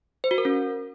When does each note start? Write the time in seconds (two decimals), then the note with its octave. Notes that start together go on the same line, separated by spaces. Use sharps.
0.24 C5
0.31 F#4
0.38 A#4
0.45 C#4